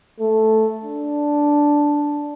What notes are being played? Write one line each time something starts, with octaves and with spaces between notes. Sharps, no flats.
A3
D4